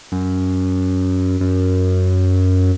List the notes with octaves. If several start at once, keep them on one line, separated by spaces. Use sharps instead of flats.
F#2
F#2